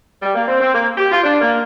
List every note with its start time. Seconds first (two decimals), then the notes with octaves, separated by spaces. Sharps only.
0.22 G3
0.35 A#3
0.47 C4
0.60 C4
0.73 A#3
0.98 G4
1.11 F4
1.24 D4
1.41 A#3